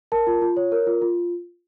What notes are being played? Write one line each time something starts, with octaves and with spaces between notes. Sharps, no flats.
A#4 A5
F4
F4
C#5
A#4
F4
F4